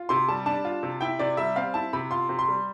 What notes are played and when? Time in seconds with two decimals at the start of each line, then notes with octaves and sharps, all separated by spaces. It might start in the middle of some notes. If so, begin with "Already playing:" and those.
Already playing: F4
0.09 C3 C6
0.28 G3 A5
0.46 D4 A5
0.65 F4
0.83 C3
1.01 E4 G5
1.19 C3 D5
1.37 G3 E5
1.56 C4 F5
1.74 E4 A5
1.93 C3 B5
2.11 F4 C6
2.29 C3
2.39 C6
2.48 G3